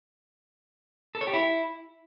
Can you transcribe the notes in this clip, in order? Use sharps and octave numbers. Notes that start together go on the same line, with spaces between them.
A4
C#5
G4
E4